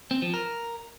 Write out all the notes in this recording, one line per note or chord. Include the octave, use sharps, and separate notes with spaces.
C4
F3
A#4